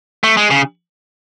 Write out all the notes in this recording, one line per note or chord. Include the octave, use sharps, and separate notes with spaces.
A3
G#3
C#3